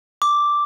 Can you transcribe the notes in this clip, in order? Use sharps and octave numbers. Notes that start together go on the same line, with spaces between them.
D6